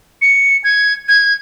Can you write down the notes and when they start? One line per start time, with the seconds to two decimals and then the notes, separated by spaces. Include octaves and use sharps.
0.22 C#7
0.64 G#6
1.08 G#6